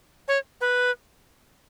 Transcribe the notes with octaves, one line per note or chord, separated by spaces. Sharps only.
C#5
B4